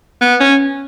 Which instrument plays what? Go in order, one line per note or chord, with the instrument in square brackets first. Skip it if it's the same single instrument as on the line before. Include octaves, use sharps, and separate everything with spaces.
[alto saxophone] B3
C#4